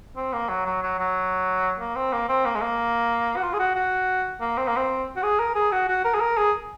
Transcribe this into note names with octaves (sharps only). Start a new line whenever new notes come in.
C4
A#3
F#3
F#3
F#3
F#3
A#3
C4
A#3
C4
A#3
G#3
A#3
F#4
F4
G#4
F#4
F#4
A#3
C4
A#3
C4
F#4
G#4
A#4
G#4
F#4
F#4
A#4
G#4
A#4
G#4